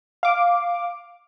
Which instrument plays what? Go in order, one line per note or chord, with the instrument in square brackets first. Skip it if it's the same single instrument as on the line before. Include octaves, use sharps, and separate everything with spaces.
[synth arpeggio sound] F5 D6